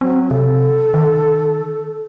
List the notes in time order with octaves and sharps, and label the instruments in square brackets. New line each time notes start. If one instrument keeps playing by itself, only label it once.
[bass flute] F#3 [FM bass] C4
[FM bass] C3 [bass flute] A4
[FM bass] D#3